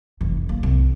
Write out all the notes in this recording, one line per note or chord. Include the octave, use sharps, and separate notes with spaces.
F1 E3
A#3
C2